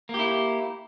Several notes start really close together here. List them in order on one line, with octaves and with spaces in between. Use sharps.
A#3 G4 E4